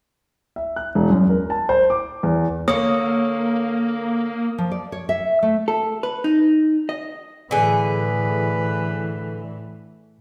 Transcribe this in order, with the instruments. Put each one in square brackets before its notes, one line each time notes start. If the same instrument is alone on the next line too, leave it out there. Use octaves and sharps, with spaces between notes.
[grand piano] E5
F#6
E1
F#2
A#4
A5
C5
D6
E2
[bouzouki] D3 C#5 [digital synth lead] A#3 [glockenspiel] D#6
[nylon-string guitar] F3
D5
C#5
E5
A3
[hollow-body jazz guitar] A4
B4
D#4
D#5
[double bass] A2 E3 [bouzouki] D3 G#4 [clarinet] B4